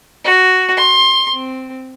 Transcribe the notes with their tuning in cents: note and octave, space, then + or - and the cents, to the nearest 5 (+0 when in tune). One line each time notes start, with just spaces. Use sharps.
F#4 +5
C6 +20
C4 -5